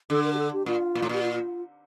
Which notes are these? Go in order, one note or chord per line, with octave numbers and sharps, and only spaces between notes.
D3 A4
A#4
G4
A4
G4
A#2 F4
A#2
A2
A#2 G4
F4